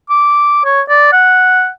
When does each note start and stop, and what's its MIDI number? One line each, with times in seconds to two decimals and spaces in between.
0.10 0.63 86
0.65 0.81 73
0.89 1.11 74
1.13 1.68 78